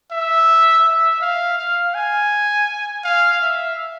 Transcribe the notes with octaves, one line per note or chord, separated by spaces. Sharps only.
E5
E5
F5
F5
G#5
F5
E5